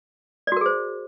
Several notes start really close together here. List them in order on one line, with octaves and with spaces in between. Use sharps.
D5 F#4 A#4 G#4 C5